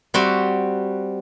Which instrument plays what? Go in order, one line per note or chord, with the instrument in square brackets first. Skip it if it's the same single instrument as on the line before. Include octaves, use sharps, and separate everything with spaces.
[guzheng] G3 C4 F#4